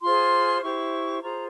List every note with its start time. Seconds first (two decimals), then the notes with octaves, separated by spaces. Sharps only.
0.02 F4 G#4 C5 C6
0.62 E4 G4 C5 C#6
1.22 F4 G#4 C5 A#5